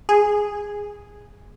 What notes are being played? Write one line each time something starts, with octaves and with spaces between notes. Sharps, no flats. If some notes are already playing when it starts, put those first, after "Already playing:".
G#4